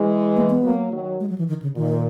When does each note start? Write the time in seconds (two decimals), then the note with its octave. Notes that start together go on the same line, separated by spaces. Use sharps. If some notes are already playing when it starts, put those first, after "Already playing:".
Already playing: E3 G#3
0.36 A#3
0.50 B3
0.63 F#3 A#3
0.92 D#3 F#3
1.20 G#3
1.29 F#3
1.38 E3
1.48 D#3
1.62 C#3
1.76 A#2 D#3